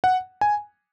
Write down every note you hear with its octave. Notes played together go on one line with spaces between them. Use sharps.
F#5
G#5